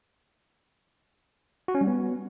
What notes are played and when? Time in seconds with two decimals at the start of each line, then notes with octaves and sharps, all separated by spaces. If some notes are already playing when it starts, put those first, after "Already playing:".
1.68 F#4
1.75 C#4
1.81 G3
1.87 B3